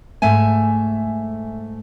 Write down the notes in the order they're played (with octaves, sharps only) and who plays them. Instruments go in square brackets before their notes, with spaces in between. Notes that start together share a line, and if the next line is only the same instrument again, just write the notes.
[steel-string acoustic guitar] G#2 A3 E5 G#5